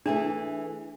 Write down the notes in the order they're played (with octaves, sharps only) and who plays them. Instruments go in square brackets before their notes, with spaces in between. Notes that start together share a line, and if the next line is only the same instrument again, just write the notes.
[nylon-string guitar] E3 A3 G#4 [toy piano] D4